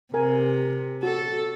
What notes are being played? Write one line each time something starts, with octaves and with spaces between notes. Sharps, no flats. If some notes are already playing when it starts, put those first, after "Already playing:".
C3 A#4 G#5
F#4 A4